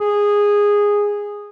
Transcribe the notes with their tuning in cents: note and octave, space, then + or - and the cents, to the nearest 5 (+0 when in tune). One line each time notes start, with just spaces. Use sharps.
G#4 -10